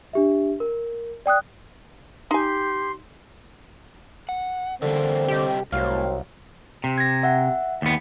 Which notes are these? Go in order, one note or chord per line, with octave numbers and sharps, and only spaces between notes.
D4 G4 E5
A#4
D5 G5 D#6 F#6
D#4 G4 G#5 C6
F#5
E2 D3 G3 A#3 C4
C3 G3 G4 D#5
C2 A2 D#3 F#3 C4 F5
C3
G#6 A#6
E5 F#5
D#2 B3